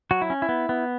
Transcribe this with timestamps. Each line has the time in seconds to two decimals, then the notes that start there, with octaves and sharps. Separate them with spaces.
0.11 F#3 F#4
0.22 E4
0.30 C#4
0.42 E4
0.49 B3
0.69 B3